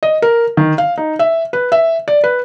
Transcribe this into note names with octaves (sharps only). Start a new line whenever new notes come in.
D#5
A#4
D#3
F5
D#4
E5
B4
E5
D5
B4